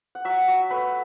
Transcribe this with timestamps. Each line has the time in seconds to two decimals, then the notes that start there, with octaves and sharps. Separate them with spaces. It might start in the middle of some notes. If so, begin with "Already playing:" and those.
0.15 F#5
0.25 F#3 E5
0.48 F#3
0.70 A3 B4